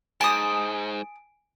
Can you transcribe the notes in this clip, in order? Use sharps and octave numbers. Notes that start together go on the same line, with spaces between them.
G#2 G#5 A5 D#6 D7